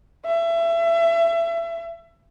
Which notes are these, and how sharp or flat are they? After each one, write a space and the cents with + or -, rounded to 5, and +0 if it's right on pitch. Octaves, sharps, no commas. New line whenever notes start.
E5 +30